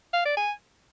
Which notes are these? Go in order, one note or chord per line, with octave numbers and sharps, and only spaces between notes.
F5
D5
G#5